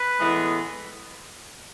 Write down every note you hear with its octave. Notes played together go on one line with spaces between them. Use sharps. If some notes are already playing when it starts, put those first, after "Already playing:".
Already playing: B4
A2 E3 G#3 B3